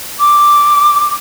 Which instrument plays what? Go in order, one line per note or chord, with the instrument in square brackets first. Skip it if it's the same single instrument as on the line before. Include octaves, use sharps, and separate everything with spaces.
[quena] D6